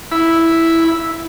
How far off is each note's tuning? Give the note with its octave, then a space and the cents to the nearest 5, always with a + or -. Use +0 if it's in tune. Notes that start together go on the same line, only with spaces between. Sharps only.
E4 +0 B5 +0